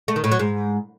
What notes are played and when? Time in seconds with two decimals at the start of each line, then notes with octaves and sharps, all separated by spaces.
0.08 A3
0.16 D#3
0.24 A2
0.32 F#3
0.39 G#2